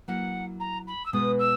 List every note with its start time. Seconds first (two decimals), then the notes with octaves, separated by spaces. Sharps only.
0.08 F#3 A#3 E4 A#4 F#5
0.60 A#5
0.87 B5
1.06 E6
1.13 B2 G#3 B3 D#6
1.39 E6